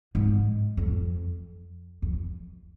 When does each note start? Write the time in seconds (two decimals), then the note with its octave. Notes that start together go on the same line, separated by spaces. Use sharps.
0.15 G#2
0.77 F2
2.02 F2